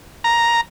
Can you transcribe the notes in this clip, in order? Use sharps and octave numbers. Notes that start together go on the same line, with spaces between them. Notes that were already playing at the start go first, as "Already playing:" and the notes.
A#5